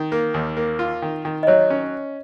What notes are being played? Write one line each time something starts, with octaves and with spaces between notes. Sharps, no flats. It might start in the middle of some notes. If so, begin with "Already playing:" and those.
Already playing: D#3
A#3
D#2
A#3
F4
D#3
D#3
D#5
F#3 C#5
C#4